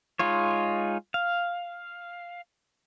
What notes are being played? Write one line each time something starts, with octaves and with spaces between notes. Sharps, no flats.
G#3 D#4 F4 C#5
F5